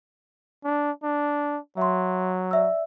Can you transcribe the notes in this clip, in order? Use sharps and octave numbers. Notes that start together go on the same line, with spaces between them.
D4
D4
F#3 E5 C6
D5 E5 E6